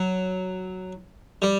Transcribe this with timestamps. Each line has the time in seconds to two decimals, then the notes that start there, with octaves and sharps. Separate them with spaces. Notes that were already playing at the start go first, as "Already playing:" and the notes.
Already playing: F#3
1.42 G3